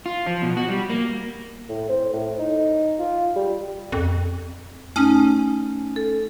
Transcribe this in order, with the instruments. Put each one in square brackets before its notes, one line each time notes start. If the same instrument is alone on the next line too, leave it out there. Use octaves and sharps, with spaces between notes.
[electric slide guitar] F4
F3
B2
F#4
G3
A#3
[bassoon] A2
C4
A2
D#4
F4
G3
[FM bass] F2
[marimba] A3 D#4 [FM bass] C#4
[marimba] A4